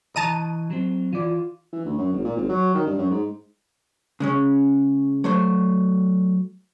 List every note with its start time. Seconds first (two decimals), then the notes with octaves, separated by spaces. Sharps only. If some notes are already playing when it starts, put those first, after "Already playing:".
0.16 E3 D#5 A5 A#5 D#7
0.71 F#3 C4
1.13 E3 F4 D5
1.72 E3
1.85 D2
1.98 F#2
2.12 G#1
2.24 A#2
2.36 G#1
2.49 F#3
2.74 D#3
2.86 G2
2.98 F#2
3.11 G#2
4.20 C#3 G#3 C#4
5.24 F#3 A3 C5